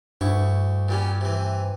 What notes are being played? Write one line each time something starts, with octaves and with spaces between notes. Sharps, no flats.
D2 G2 E4 C#6
A#2 G3 C#4
C3 E3